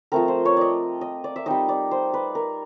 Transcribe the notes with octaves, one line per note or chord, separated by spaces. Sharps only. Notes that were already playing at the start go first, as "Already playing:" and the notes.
F3 A3 C4 A#4
C5
C#5
D5 D#5
D#5
D5
E5
G3 C4 D#4 D#5
D5
C5
B4
A#4